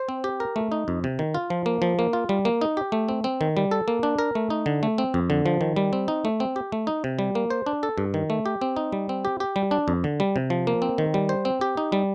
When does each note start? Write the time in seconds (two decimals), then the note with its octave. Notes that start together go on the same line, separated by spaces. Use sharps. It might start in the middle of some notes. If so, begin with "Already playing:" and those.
Already playing: C5
0.09 C4
0.24 G4
0.40 A#4
0.56 A3
0.72 D#4
0.88 F2
1.04 C3
1.19 D#3
1.35 F4
1.50 F3
1.66 A#3
1.82 F3
1.99 A#3
2.13 F4
2.29 G3
2.45 A#3
2.61 D#4
2.77 G4
2.92 A3
3.09 C4
3.24 C4
3.41 D#3
3.57 G3
3.71 A4
3.88 A#3
4.03 D4
4.19 A#4
4.35 A3
4.50 D#4
4.66 D3
4.83 A3
4.98 C4
5.14 F2
5.30 D3
5.46 F3
5.61 D#3
5.76 G3
5.93 C4
6.08 D#4
6.25 A3
6.40 C4
6.56 G4
6.72 A3
6.87 D#4
7.04 C3
7.19 G3
7.35 A#3
7.50 C5
7.66 D4
7.83 A4
7.98 G2
8.14 D#3
8.30 A3
8.46 G4
8.61 C4
8.77 D#4
8.92 G3
9.09 C4
9.25 G4
9.40 G4
9.56 G3
9.71 D4
9.88 F2
10.04 D3
10.20 G3
10.36 C3
10.50 F3
10.67 A#3
10.82 C4
10.98 D#3
11.14 G3
11.29 C5
11.45 C4
11.61 G4
11.77 D#4
11.92 G3